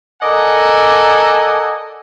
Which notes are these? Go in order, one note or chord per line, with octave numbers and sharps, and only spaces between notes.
A4 A#4 D5 D#5 F#5 G#5